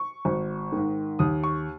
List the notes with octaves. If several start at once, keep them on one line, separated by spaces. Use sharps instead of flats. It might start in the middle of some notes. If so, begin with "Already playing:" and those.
Already playing: C#6
G#1
G#2 D#3
D#2 D#6
C#6